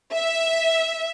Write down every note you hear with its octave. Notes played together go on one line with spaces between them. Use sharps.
E5